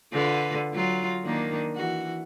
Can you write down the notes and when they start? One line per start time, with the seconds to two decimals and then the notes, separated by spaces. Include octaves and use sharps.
0.12 D3 F4 B4
0.73 F#3 F4
1.24 D#3 A#3 D4
1.75 E3 F#4